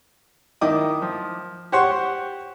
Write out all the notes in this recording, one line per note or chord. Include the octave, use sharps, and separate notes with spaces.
D#3 E4 D#5 D6 D#6
F3
G4 C5 C#5 F#5 C6 C#6